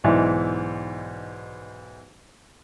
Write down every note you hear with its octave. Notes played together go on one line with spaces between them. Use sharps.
B1 G#2 E3 E4 D5